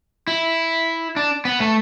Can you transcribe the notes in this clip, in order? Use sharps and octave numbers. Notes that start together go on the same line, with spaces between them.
E4
D4
B3
A3